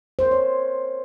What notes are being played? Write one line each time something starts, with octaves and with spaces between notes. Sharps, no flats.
C5
A#4
C#5